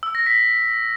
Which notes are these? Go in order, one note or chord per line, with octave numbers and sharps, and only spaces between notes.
E6
A#6
B6